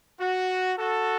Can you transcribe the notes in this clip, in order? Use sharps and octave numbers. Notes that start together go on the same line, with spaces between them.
F#4
F#4 A4